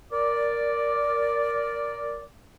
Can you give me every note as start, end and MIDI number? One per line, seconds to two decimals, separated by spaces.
0.12 2.23 70
0.12 2.23 74